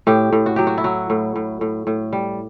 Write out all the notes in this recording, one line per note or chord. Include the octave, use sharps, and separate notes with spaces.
A2 G4
A2
F#4
F#3 G4
F#4
E4
F#3 F#4
A2
A2
A2
A2
G3